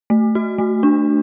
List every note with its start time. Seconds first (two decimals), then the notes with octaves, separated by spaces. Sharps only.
0.10 A3
0.35 F#4
0.58 A3
0.83 D4